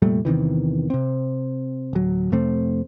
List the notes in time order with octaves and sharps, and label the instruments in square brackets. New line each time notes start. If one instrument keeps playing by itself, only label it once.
[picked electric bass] F1 A#2 G3 A3
E2 C3 D#3 E3
C3 C4
D1 F#3
F2 C3 A3 C4